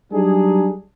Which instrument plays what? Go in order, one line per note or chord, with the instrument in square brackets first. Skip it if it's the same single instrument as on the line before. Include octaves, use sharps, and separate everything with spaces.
[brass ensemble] F#3 G3 D4 D#4 G#4